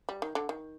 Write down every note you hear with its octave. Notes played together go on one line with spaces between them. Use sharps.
G3
D#3
D3
D#3